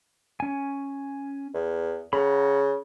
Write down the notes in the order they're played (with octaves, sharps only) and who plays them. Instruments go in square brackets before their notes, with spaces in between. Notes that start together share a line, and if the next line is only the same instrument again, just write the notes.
[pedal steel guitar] C#4 G#5
[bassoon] E2
[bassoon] C#3 [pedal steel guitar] F#5 A#5 B5